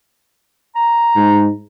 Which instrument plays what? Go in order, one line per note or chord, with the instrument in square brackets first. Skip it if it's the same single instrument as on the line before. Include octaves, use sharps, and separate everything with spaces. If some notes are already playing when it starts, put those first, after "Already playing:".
[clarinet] A#5
[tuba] G#2